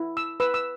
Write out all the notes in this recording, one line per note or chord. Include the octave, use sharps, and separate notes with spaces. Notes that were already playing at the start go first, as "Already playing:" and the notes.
Already playing: E4
E6
B4 E6
E6